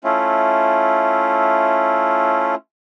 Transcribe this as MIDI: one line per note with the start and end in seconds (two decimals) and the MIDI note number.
0.04 2.55 57
0.04 2.55 61
0.04 2.55 64
0.04 2.55 65